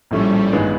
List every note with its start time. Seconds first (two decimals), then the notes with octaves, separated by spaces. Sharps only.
0.11 A#1 A2 F3 G3 A3 C#4
0.53 A1 G2 D#3 G#3 B3